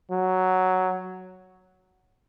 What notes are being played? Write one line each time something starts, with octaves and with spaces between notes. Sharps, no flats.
F#3